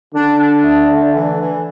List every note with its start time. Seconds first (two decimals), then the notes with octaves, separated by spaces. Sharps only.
0.14 D3 D4
0.39 D4
0.64 A3
0.90 D4
1.15 E3
1.40 E3